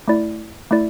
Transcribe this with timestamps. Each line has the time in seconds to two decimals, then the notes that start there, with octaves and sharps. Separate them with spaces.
0.08 A3 E4 D5
0.71 A3 E4 D5